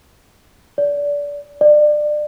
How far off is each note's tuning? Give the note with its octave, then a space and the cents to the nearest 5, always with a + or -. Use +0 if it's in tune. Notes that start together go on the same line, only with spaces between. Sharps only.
D5 -25
D5 +25